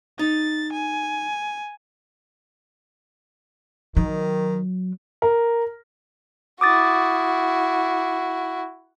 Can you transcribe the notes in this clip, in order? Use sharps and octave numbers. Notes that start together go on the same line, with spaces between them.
D#4 A6
G#5
D#3 F#3
A#4
E4 F#4 D6 D#6 A6